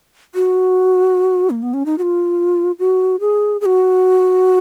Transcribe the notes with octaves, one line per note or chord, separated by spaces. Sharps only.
F#4
A#3
B3
C#4
D#4
F#4
F4
F#4
G#4
G#4
F#4